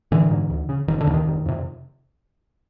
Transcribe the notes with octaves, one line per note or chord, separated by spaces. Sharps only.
A1 D3 E3
G#2
D2
C#3
F1 D#3
D3
D#2 C#3
D#3
F1
F2 C3